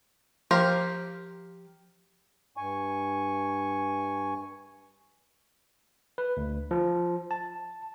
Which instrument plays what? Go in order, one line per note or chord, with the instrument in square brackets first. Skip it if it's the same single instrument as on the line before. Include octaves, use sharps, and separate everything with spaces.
[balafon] F3 [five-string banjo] G4 A#4 F5
[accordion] G2 G#5 C#6
[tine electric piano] B4
D2
F3
A5